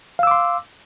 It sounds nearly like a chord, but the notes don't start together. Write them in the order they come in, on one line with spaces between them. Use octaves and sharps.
F5 E6 D6 C6